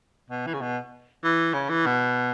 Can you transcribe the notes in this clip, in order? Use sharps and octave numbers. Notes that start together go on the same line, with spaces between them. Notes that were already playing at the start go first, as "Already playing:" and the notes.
B2
E3
C#3
B2
E3
C#3
E3
B2